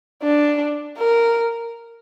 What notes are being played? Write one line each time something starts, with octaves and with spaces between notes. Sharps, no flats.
D4
A#4